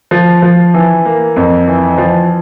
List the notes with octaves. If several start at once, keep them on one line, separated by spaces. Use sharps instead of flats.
F3
F3
E3
A#3
F2
E3
F3